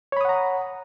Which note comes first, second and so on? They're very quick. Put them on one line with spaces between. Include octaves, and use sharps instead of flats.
C#5 B5 D#6 F#5 A#5